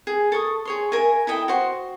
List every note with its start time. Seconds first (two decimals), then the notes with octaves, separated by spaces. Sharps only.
0.07 G#4
0.32 A4 C#6 D#6
0.65 G#4 C#5 C6
0.92 A#4 E5 G#5
1.27 E4 A4 D#5 G5
1.48 F#4 C5